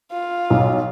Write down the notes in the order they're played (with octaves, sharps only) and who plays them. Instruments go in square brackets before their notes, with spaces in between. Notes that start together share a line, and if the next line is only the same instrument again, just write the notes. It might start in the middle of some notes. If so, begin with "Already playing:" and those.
[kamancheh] F4
[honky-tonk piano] B1